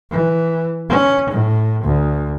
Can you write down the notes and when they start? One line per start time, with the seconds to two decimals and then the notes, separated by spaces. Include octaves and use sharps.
0.10 E3
0.89 C#4
1.30 A2
1.84 D2